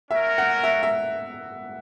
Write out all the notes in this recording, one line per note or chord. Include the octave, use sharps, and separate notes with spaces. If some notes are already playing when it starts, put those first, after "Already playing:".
C#4 F#4 A#4 E5
F#5
E5
E5